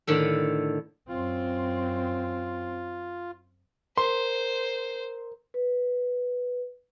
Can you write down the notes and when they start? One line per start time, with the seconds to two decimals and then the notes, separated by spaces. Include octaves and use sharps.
0.07 A2 D3 D#3 A4
1.09 F#2 C4 F4
3.98 A#4 C5 C6
5.54 B4